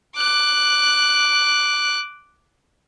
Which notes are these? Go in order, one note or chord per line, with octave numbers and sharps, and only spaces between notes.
D6 F#6